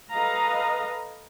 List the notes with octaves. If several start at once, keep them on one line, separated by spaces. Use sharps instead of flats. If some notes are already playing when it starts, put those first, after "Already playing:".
A4 B4 D#5 F5 A#5